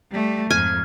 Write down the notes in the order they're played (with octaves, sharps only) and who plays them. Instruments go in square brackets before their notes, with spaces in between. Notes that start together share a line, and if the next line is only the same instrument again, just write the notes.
[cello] G3 A3
[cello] F2 G#2 [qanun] G#5 [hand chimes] F6